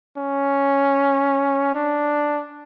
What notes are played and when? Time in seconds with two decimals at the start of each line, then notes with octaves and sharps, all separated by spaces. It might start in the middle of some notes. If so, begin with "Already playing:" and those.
0.17 C#4
1.75 D4